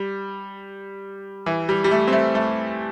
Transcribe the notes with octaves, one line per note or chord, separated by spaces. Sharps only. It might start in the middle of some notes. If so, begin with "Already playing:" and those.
Already playing: G3
E3
G3
G3
A3
C4
A3
A3